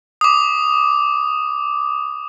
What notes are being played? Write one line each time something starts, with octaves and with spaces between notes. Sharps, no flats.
D6 D#6